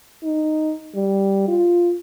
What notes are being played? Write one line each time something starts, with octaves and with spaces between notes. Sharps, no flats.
D#4
G3
F4